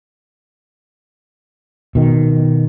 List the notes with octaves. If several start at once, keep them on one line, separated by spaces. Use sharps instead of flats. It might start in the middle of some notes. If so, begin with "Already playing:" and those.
B2 D#3